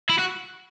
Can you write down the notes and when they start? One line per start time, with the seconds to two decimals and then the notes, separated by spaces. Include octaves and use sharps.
0.10 E4
0.19 F#4